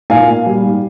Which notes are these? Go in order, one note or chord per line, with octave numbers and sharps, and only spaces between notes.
A#2 F5 G#5
A#3
G3
G#2